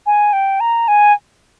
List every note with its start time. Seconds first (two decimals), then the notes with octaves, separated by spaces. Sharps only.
0.06 G#5
0.33 G5
0.60 A#5
0.88 G#5